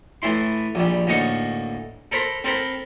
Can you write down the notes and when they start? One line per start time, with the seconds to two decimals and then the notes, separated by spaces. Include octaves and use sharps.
0.22 A2 E3 E4 C6
0.75 A#1 G3
1.07 D2 A2 A#3 D#4 C#6
2.12 A4 A#4 C5 B5 C6
2.44 C4 A4 A#4 C5 B5